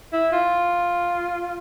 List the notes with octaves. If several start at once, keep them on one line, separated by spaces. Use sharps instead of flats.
E4
F4